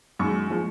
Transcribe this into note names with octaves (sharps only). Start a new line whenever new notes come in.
F#2 D#3 G#3 C#6
F3 G#3